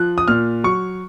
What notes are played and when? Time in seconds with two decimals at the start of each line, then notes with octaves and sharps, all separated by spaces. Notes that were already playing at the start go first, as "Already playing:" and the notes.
Already playing: F3 F#6
0.18 D#6
0.28 A#2 F6
0.64 F#3 C#6